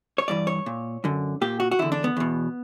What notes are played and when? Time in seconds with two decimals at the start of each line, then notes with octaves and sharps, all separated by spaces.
0.18 C#5
0.28 G2 E3 D5
0.47 C#5
0.66 A#2
1.04 F#2 D3
1.41 A#2 G4
1.60 F#4
1.71 F#4
1.79 E2 D3 E4
1.92 D4
2.04 B3
2.17 E2 B2